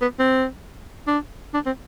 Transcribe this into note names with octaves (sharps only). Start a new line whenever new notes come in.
B3
C4
D4
D4
C4